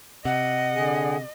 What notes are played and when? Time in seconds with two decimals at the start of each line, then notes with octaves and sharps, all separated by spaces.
0.25 C3 D#5 F#5
0.73 D3 G#4